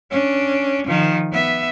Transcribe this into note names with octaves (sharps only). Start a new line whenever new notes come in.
C#4 D4
D#3 F3
B3 E5